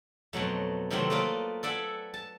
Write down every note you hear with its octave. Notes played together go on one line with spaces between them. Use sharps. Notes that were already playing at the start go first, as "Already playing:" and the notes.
F2 B2 F#3 A3
C3 D#3 E3 F#3 A3 C4
A3 A#3 F4 B4 D5 D#5
A4 D5 E5 F#5 G#5
A5